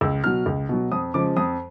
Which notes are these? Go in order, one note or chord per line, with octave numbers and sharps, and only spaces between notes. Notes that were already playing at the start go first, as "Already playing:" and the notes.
C#2 E6
B2 F#3 F6
C#2
B2 F#3
F2 D#6
C#3 F3 G#3 D6
F2 D#6